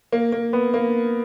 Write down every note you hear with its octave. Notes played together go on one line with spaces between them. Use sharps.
A#3
A#3
B3
A#3